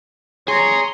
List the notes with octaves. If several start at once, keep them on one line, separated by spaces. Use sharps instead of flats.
G#4 C#5 A#5 C6